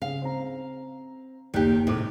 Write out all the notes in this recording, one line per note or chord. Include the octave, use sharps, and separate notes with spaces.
C#3 F5
C4 A#5
F#1 D#2 D#3 G4 F#6
A2 C3 G#3 D6